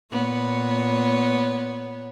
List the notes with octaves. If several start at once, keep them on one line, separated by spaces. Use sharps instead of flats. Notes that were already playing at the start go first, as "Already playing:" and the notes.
A#2 B3 C#5